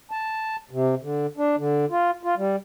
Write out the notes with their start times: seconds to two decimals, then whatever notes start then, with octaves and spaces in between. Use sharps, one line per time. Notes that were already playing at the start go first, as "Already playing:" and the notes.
0.11 A5
0.71 C3
1.02 D3
1.37 D4
1.57 D3
1.90 F4
2.23 F4
2.37 G3